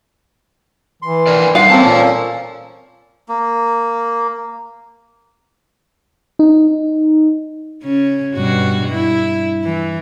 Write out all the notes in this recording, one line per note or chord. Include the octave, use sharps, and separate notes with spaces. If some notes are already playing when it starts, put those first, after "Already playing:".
E3 C6
D4 A#4 D5
G3 D#4 F4 F5 F#5
A#3 C4 C#4 A4 C5 A5
A#2
A#3
D#4
C#3 C#4
G2 B2 F#4
E4
E3